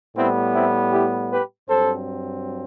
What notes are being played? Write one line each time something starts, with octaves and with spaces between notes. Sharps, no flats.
A2 G3 B3 C4 E4
C4 E4
E4 G4
G4 B4
G2 F#3 C4 A4 C5